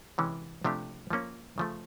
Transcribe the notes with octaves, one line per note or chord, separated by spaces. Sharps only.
C3 E3 G#3 C#4
C3 F3 A3 D4 G4
F3 A#3 C#4
C#3 F3 A3